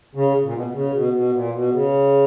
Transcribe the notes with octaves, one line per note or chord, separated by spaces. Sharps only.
C#3
A#2
B2
B2
C#3
B2
B2
A#2
B2
C#3